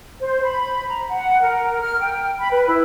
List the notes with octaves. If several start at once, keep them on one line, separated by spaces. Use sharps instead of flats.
C5
B5
A#5
F#5
A#4
F6
G5
B5
B4
E4